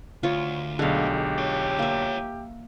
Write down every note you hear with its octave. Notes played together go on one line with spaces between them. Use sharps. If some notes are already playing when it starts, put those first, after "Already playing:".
D2 F4 C#5
B1 D3 G#3 G4 F5
F4 C#5
A#3 E5